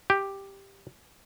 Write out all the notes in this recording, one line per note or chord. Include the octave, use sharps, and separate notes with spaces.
G4